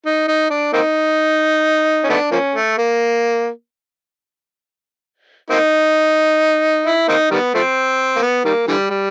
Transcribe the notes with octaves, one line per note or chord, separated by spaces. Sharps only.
D#4
D#4
D4
A#3 C4 D#4
C#4
A3 B3 D4
F3 A#3 C#4
A3
A#3
A#3 C4 D#4
E4
A#3 C4 D#4
D#3 G3 B3
F3 A3 C4
A#3
B3
D#3 G3 A#3
D3 E3 G3
G3